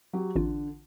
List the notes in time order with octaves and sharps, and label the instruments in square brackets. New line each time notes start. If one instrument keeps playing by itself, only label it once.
[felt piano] F#3 G4
[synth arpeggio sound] A1 F4 [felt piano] D3